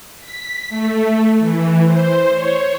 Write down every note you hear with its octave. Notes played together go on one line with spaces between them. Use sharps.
B6
A3
E3
C5
C#5